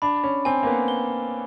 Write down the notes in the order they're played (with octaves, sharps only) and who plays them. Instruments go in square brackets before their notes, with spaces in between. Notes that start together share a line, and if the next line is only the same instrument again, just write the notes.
[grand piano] D4 [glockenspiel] B5
[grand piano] C#4
[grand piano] C4 [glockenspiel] G#5
[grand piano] A#3
B3
[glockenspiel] G7